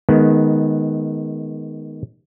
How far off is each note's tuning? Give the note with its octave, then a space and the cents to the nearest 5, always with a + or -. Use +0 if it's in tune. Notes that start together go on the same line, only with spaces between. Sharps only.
D#3 +0 G#3 +25 B3 +0